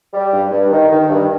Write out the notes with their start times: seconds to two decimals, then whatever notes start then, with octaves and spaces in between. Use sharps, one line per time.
0.13 G3
0.32 G2
0.51 G2
0.71 D#3
0.90 D#3
1.09 G2